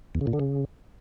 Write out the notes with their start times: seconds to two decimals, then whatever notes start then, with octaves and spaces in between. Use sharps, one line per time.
0.15 E2
0.21 C#3
0.27 A#2
0.33 D3
0.39 C#3